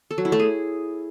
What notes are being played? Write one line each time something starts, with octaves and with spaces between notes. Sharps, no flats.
A4
F#3
E4
A3
G#4